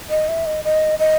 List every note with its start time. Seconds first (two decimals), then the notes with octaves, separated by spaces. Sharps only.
0.10 D#5
0.28 E5
0.46 D#5
0.64 D#5
0.99 D#5